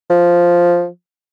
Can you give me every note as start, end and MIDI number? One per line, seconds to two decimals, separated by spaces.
0.10 0.87 53